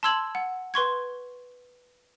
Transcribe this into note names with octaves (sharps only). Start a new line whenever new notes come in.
A5 C6 E6 G#6 F#7
F#5
B4 C6 C#6 G#6